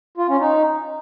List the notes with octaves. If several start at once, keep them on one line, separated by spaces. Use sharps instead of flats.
F4
C#4
D#4